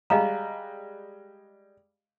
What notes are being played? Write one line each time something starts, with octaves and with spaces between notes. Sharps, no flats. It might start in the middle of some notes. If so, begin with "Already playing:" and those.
G3 G#3 D#5 F5 A#5